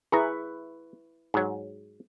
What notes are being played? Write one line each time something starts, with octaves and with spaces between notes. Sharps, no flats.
E4 G#4 B4 A#5 C#6
G#2 F#3